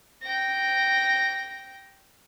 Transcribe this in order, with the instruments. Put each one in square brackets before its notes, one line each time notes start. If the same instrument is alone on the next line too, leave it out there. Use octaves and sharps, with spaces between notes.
[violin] G5 A#6